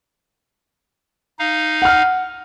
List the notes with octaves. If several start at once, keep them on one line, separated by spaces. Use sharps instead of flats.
D#4 F5
F#5 F6